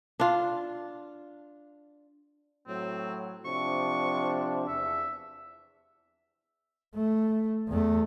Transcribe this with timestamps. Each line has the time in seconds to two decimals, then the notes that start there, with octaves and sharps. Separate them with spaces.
0.20 D4 F4
2.68 A2 F#3 C4
3.45 C3 F3 D4 C#6
4.68 E2 E5
6.95 A3
7.68 E2 A3